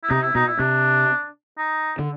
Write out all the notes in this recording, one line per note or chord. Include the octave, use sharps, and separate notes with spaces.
E4
C3 D#4
E4
B2 D#4
E4
C3 D4
D#4
D3